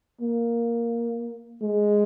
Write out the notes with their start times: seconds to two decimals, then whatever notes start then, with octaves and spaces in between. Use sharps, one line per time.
0.21 A#3
1.62 G#3